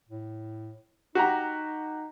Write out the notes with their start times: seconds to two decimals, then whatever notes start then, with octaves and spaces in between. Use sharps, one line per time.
0.09 A2
1.15 D#4 F#4 G4 A#5